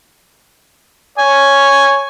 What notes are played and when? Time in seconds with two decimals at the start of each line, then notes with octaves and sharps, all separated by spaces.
1.18 C#5 G#5